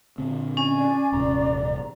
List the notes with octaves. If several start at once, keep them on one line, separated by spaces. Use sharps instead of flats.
A#2 D3 C4
C#4 G#5
D5
D#1 G#1 C3 A#5